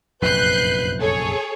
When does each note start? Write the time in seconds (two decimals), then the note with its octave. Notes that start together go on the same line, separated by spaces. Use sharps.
0.22 F1 A#1 F#2 B4 F#6 G6 C7
1.00 G#4 A4 C#5